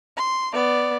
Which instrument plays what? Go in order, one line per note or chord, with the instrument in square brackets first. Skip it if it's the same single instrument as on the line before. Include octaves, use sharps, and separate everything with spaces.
[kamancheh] C6
B3 D5